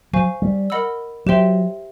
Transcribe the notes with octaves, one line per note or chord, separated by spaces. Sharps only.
F#3 C5 F5 G#5 C#6
G3
A#4 D#5 F#5 B5 E6
F#3 G4 C5 E5 G5 C6